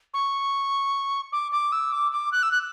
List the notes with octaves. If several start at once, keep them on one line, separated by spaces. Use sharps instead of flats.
C#6
D6
D6
E6
D6
D6
F#6
E6
F#6